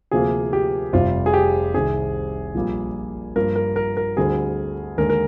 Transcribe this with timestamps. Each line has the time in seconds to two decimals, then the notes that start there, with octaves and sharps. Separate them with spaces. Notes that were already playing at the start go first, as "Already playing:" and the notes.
0.11 D2 C3 F3 A#3 G#4
0.53 G4
0.93 F1 F2 C3 G3 C4 F4
1.26 G#4
1.34 G4
1.74 C2 C3 D#3 G#4
2.55 A#1 A#2 G3 A#3
3.36 G2 F3 A#3 A#4
3.56 A#4
3.76 A#4
3.97 A#4
4.17 D2 D3 G3 C4 G#4
4.98 D#2 D3 G#3 A#4
5.10 A#4